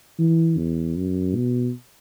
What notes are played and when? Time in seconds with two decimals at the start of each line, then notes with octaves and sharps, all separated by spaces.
0.19 E3
0.58 E2
0.97 F#2
1.36 B2